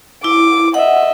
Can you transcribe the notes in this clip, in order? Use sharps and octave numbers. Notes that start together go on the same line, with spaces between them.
E4 D6
D#5 E5 F#5